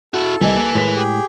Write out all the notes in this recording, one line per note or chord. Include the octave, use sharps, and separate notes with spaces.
E4 F#4 A4
C2 B4 D#5 G#5
A#3
A2 G#3 A#4 B6
G4 G#4